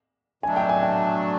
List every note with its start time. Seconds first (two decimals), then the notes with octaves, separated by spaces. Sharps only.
0.43 B2 F#3 A3 D4 G#5
0.57 G5
0.69 G#5
0.83 G5